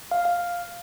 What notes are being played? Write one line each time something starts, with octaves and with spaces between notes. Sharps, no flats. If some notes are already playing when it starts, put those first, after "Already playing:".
F5
F5